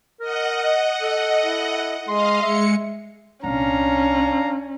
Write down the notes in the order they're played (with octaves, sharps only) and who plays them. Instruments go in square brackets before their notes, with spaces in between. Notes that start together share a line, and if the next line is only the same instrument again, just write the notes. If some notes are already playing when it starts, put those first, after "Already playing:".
[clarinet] A#4 [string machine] D#5 F#5
[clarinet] A4
[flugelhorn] E4
[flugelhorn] G#3 [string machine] D#5 F5 [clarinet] C6
[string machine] G#3 C#7 [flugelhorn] E5
[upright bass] C2 A#2 [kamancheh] C#4 [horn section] D4 F5 A#5